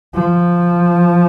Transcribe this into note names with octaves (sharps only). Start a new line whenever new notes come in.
F3